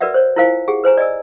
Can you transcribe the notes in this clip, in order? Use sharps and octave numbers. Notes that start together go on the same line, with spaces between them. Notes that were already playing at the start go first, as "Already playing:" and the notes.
F#4 A#4 B4 D5 E5 F#5
C5 C#5
E4 F4 A#4 C5 F5 G#5
G4 G#4 F#5
B4 C5 G#5 A#5
D5 D#5 G#5 E6